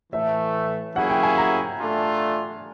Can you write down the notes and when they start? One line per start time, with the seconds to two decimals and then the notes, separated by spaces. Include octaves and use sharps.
0.13 A2 E3 A3 E5
0.96 F#3 A#3 C#4 E4 G#4 F#5
1.10 G5
1.23 G#5
1.38 A#5
1.78 A3 D4 F4